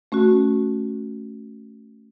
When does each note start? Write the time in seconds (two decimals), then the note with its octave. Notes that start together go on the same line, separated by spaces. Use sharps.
0.12 A3 C#4 F#4